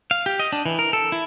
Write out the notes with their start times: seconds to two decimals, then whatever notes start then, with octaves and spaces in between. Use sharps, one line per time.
0.11 F5
0.26 G4
0.39 D#5
0.52 D4
0.66 E3
0.79 A#4
0.93 A4
1.12 E4